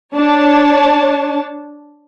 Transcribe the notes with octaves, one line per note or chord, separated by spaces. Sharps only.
D4 C#5 A5